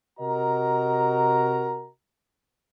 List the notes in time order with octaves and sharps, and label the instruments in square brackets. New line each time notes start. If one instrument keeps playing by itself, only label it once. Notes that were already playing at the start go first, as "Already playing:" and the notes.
[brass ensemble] C3 F#4 A#4 D#5 A#5